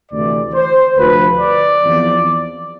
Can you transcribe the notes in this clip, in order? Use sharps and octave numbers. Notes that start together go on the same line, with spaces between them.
D2 C3 E3 D5
C5
D2 C3 F3 B4
D5
E2 C3 F3